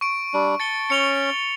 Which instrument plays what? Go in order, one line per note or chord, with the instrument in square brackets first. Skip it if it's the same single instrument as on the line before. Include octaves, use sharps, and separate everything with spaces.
[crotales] C#6 D7
[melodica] G3 D4
[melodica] A5 [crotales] A6 C#7 G7
[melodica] C#4 [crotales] C#7 F7 G7